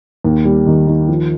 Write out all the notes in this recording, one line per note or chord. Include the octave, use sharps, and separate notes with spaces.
D#2
G3
D#3
D#3
F3